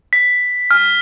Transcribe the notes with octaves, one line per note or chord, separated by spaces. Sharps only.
B6
F6